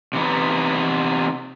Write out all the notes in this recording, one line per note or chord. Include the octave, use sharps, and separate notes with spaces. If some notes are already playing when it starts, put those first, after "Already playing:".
C3 E3 B3 D#4